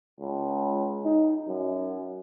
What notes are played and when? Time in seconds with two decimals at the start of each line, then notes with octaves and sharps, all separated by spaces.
0.20 C#2
1.05 D#4
1.48 F#2